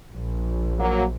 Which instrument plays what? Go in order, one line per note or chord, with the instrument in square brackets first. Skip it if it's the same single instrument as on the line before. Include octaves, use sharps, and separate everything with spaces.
[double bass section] A#1
[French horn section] F#3 A#3